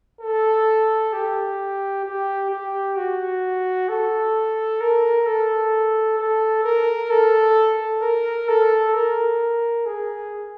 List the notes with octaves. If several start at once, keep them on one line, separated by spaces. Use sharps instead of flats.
A4
G4
G4
G4
F#4
A4
A#4
A4
A4
A#4
A4
A#4
A4
A#4
G#4